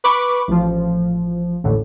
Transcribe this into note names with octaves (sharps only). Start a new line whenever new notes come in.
B4 B5 C#6 D6
A1 F3
A1 D#2 A2 D3